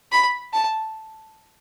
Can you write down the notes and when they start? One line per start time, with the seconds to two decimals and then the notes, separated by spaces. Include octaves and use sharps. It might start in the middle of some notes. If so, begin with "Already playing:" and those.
0.12 B5
0.53 A5